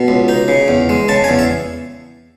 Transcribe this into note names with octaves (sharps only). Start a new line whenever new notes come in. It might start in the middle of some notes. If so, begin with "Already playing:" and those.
Already playing: B2
C#2
D#4
C#3
E2
G#3
C#3 A5
G#5
E2
E5